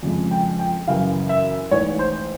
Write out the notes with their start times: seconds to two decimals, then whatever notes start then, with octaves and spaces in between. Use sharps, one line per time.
0.03 F2 C#3 F3 G#3
0.31 G5
0.59 G5
0.87 F#2 C#3 E3 F5
1.29 E5
1.71 A1 G#2 E3 C#5
1.99 C5